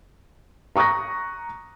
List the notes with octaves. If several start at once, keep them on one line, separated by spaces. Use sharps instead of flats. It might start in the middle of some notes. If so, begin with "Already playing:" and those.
A#5 C#6 D#6 F#6 A#6